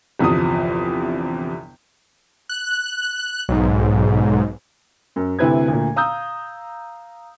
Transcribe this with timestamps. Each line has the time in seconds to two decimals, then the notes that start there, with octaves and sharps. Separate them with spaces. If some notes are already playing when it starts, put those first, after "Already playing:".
0.19 G1 E2 C3 F3 D#6
2.49 F#6
3.49 B1 G#2
5.16 F#2
5.39 D2 C3 E4 B4 G#6
5.68 D2 A#2
5.96 F5 A#5 D#6 E6 G6